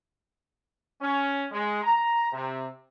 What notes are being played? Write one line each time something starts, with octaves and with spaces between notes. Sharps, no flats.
C#4
G#3
A#5
C3